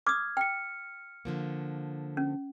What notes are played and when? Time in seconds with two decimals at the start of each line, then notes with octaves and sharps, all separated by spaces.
0.07 D6 D#6 F6 G#6
0.37 G5 F6 C#7
1.25 D3 F3 A#3
2.17 C#4